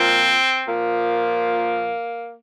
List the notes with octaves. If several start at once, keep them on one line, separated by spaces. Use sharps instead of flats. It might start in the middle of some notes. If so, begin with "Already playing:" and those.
Already playing: A#2 F3 C4
A#2 F3 A#3